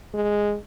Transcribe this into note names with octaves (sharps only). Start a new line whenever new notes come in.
G#3